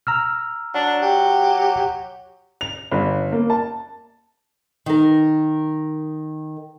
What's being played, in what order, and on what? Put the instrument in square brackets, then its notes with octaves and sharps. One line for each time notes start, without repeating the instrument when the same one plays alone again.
[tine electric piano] A#5 E6 F6
[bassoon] F#3 [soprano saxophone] D4
[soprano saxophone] G4
[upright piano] F7
G1
A#3
A5
[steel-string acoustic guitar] D#3 A#4